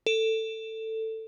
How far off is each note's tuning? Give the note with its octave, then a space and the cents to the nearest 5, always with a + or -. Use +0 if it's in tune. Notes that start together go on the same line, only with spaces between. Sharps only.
A4 +15